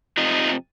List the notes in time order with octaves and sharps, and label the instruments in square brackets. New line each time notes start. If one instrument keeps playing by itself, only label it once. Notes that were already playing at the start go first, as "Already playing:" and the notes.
[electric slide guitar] F2 C3 F3 D#4 F4